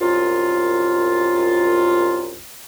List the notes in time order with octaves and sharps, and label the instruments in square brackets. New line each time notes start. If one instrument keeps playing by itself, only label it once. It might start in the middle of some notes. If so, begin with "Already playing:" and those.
[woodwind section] C2 F#2 F4